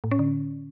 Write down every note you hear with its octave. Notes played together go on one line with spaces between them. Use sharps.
A2
C#4
D3